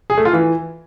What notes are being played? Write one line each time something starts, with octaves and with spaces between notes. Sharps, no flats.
G#4
A3
F4
E3